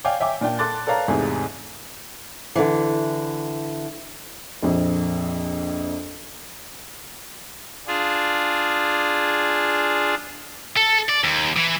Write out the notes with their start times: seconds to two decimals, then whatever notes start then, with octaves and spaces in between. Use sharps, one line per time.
0.05 C#5 D5 F5 G5 G#5 D6
0.20 C#5 E5 G5 G#5 D6
0.41 A#2 D4 D5 G5
0.59 A4 A5 C6 D6 F#6 A6
0.87 A4 B4 C#5 D5 F5 A#5
1.08 E2 G#2 C3 A3 G#4
2.56 D3 E3
4.63 A#1 F2
7.87 D4 F4 G#4
10.76 A4
11.09 D5
11.24 D#2
11.56 E3